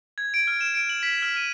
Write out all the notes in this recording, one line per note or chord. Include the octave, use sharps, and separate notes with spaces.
G#6
D7
F6
E7
D7
F#7
B6
F6
D#7